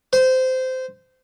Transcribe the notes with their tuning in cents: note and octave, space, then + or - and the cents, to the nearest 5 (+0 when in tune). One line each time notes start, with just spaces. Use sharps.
C5 -20